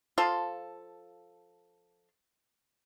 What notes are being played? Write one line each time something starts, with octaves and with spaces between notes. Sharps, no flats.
F3 F4 A4 C6